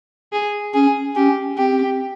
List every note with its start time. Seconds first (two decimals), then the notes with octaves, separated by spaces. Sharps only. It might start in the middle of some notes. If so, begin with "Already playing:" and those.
0.33 G#4
0.74 C#4 G#4
1.16 C#4 G4
1.57 C4 G4